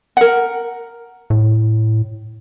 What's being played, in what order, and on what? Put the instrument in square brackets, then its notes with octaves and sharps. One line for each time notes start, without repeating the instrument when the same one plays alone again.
[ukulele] A#4 F#5
[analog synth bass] A2